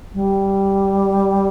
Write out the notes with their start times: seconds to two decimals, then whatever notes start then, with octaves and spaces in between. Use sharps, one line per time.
0.14 G3